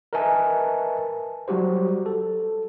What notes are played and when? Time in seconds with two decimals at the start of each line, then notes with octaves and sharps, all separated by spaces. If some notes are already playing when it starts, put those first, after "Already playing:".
0.13 A#4 B4 D#5 E5 G#5 A5
1.48 F#3 G3 F#4 G4 C5
2.06 A4